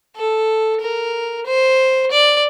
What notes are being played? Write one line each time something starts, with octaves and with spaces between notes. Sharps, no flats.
A4
A#4
C5
D5